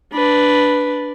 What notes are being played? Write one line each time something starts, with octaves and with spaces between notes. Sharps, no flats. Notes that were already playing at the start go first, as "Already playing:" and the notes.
D4 B4